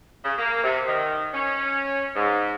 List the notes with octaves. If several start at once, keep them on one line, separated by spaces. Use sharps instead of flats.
C#3
A#3
C3
D#3
C#4
G#2